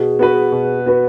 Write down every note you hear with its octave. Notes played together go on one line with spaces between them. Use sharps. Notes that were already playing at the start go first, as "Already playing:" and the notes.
Already playing: B2 G#4
B3 F#4 B4
B2
B3 F#4 B4